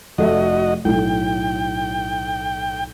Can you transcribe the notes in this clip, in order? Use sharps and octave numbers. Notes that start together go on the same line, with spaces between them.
F1 F#4 A4 D#5 E5
B1 A2 G5